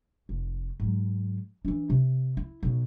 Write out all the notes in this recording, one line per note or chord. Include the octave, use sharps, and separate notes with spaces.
F1
G#2 F#3
E3 D4
C3
E4
B1 B2